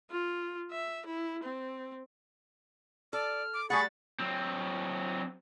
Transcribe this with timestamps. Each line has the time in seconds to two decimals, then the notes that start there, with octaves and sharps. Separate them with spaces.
0.11 F4
0.71 E5
1.06 E4
1.43 C4
3.13 A4 D5 F6
3.54 D6
3.70 G3 A3 G#4 F#5 B5 C#6 A6
4.19 F#3 C4